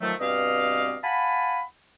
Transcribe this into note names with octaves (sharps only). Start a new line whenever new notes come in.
D#3 F3 F#3 A3
G2 B2 C4 D5 D#5 F5
F5 F#5 G#5 A5 B5